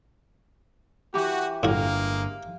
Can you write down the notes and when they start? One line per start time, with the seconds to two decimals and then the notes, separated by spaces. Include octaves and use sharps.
1.14 E3 F#4 G4
1.63 G1 A2 G#3 A#3 F#4 F5